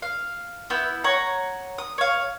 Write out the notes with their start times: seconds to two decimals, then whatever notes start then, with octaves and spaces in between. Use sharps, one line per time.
0.02 F5
0.70 B3 E4 E6 G6
1.04 C#5 F#5 A#5
1.78 D#6
1.98 C#5 F5